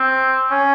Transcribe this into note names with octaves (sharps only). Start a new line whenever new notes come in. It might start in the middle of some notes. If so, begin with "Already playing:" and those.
Already playing: C4
C#4